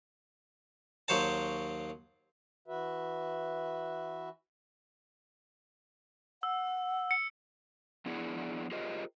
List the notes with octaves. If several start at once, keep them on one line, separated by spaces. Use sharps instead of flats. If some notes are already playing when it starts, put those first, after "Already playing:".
D#2 F#3 C5 C#5 A5
E3 F#4 B4 E5
F#5 E6
C#7
F2 B3 D4 E4 G#4 F#5
F4 G4 G#4 A#4 C5 D#5